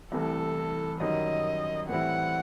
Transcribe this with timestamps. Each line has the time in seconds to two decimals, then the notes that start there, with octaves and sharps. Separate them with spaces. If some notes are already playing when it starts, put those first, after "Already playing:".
0.12 C2 C3 E3 A3 A4
1.00 F#2 D#3 G3 D#4 D#5
1.89 A2 E3 G3 C4 E4 F#5